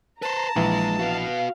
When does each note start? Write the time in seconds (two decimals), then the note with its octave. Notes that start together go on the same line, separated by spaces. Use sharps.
0.22 B4 C5 A5 A#5
0.56 A#1 E3 G#3
0.99 F#4 B4 F5